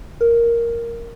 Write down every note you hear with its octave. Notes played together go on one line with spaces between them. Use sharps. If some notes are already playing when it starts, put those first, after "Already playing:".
A#4